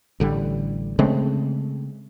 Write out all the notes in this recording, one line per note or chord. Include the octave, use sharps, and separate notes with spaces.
A1 D3 G3
C#3 G#3 A3 C4